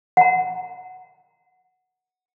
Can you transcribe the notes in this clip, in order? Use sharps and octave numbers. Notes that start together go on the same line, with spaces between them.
F#5 A#5